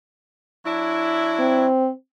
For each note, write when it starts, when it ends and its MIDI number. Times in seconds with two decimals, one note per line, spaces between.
0.65 1.66 54
0.65 1.66 62
0.65 1.66 64
1.39 1.90 60